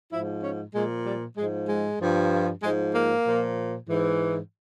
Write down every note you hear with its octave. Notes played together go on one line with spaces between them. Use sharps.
G#2 F3 E4
C#4
A#2 F3 G#3
G3
G#2 F3 G#3
G#3
G2 F3
G#2 F3 G#3
A#3
A#2 F3
G#2 E3